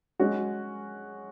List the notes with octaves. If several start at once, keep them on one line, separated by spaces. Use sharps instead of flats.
G#3 C#4 F#4